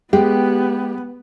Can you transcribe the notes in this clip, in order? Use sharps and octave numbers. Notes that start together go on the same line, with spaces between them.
G#3 B3 G4